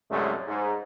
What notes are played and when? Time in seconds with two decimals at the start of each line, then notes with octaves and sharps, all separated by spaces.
0.10 C2 F#2 A2 G#3 A3
0.48 G#2